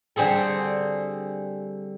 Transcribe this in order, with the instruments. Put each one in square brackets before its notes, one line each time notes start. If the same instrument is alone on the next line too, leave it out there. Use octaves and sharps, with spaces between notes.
[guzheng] D3 G3 C4 G#4 A4